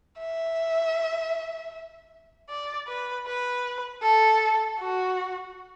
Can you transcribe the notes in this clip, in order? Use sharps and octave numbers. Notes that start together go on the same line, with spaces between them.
E5
D5
B4
B4
A4
F#4